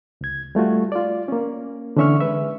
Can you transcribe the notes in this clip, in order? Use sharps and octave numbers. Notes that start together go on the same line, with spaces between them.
C#2 G#6
G3 A3 F4 F#4
F4 D5
A#3 C#4
D3 E3 C#4 E5 C#6 F6
G#3 B4 E5